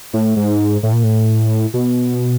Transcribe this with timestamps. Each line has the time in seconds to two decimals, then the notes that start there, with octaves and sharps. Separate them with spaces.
0.14 A2
0.36 G#2
0.83 A2
0.93 A#2
1.03 A2
1.74 B2